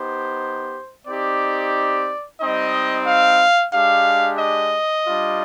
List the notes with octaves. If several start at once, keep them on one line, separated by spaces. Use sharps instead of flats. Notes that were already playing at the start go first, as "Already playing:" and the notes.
Already playing: B3 D#4 G4 C5
C4 D#4 G4 D5
G3 C4 D#4 D#5
F5
G#3 D4 G4 F5
D#5
G3 D4 F4